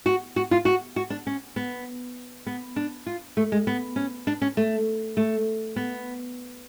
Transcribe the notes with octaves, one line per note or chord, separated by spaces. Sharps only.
F#4
F#4
F4
F#4
F#4
D4
C#4
B3
B3
D4
F4
A3
G#3
B3
C#4
D4
C#4
A3
A3
B3